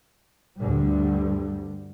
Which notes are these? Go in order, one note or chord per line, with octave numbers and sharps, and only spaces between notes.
D2 G2 D3 G3